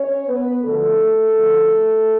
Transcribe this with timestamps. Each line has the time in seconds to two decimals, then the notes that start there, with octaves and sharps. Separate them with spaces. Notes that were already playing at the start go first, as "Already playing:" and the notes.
Already playing: C#4 C#5
0.28 B3 B4
0.63 D2 D3 F3 A3 A4
1.34 D2 D3 F3